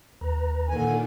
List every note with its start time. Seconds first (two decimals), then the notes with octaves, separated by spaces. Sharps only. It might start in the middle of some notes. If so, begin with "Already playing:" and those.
0.21 D#2 B4 A#5
0.69 A#2 D3 D#3 G#5